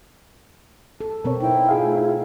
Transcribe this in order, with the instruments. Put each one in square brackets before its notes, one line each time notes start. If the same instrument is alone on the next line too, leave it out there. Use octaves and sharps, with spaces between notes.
[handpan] A4 [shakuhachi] A5
[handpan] B2 B3 C4 [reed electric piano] A#4 C#5
[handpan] D#4 [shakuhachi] E4 [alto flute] G5
[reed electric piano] F4 G#4 F5
[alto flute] A3